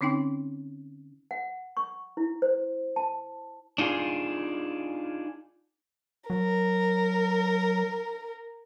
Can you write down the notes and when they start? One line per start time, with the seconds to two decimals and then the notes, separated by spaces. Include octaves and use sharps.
0.01 D3 C4 C#4 D#4 G5
1.31 F#5
1.77 C#6
2.17 E4
2.42 C5
2.96 A5
3.78 D4 D#4 F4 G#4
6.30 F#3 A#4